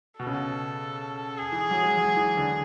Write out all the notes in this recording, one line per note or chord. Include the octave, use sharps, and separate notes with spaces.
B2 A4
C#3
B2
G#4
E3
F#3
G#3
F#3
E3
D3